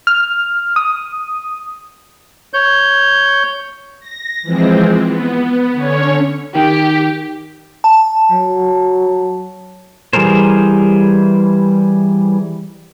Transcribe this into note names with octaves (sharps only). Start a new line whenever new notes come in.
F6
D#6
C#5 G6
A#6
E3 F3 G#3 C4
B3
D3 C#4 C#5
D#3 G4
A5
F#3
E3 G3 G#4 A#4 C5